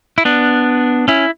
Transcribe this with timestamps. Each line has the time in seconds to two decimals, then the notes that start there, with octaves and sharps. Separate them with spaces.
0.18 E4
0.25 B3 D4
1.08 C#4 E4